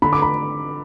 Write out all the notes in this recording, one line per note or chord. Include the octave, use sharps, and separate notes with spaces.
D3 B5
D6
B5